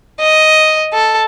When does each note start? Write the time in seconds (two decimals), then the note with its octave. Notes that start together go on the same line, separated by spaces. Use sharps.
0.20 D#5
0.93 A4